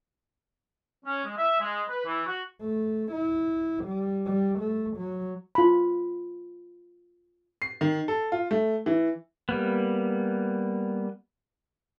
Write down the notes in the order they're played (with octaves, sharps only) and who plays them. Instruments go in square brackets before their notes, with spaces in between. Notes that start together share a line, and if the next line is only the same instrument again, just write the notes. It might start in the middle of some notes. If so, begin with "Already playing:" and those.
[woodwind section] C#4
G#3
E5
G#3
B4
E3
F#4
[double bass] A3
E4
G3
G3
A3
F#3
[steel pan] F4 B5
[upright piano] C7
D#3
A4
F4
A3
E3
[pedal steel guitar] G3 A#3 B3